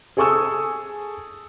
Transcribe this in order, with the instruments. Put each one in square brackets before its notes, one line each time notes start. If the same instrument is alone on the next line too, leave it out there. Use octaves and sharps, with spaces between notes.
[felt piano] G#4 A4 G#5 C#6 D#6 E6